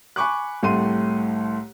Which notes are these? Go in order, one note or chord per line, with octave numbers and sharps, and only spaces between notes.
G#5 B5 C#6 D6 F#6
C2 A2 A3 C6 D#7